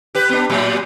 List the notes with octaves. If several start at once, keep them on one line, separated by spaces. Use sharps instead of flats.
G4 B4
B3 D4
A2 F#3 G3